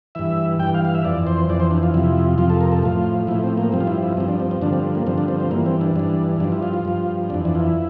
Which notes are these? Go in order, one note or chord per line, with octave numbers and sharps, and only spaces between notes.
G2 E3 E5
G2 E3 G5
F5
F5
E5
F2 E3 D5
C5
F2 E3 D5
C5
D4
F4
F2 C3 F3 E4
F2 C3 F3 F4
A4
A#4
A4
A2 F3 F4
A2 F3 E4
C4
A#3
G2 F3 C4
F4
E4
E4
G2 F3 C4
D4
C4
C4
G2 D3 F3 D4
C4
A#3
G2 D3 F3 C4
D4
C4
C4
G2 E3 A#3
C4
D4
G2 E3 D4
G2 F3 D4
E4
F4
F4
G2 F3
F2 E3 D4
D4
F4
E4